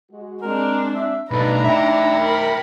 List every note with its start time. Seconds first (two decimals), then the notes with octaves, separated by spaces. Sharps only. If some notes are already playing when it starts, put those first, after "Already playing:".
0.11 G#3 F#4
0.43 G#3 C4 D4 A#4
0.95 E5
1.31 B2 A3 D4 D#4 A4 B4 A#5
1.64 E4 E5 G5
2.20 A#4 B5